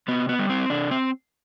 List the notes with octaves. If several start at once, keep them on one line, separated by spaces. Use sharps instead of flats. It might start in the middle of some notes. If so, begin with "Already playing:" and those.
C3 B3
B3
G3
C4
C3 D4
C4